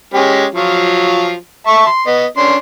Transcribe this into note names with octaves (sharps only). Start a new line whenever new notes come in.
G#3 C#4 G4
F3 F#3 F4
E5 A5 C#6
C6
B3 D#5
C#4 D4 C6